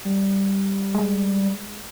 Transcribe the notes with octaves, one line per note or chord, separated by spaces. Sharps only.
G3
G#3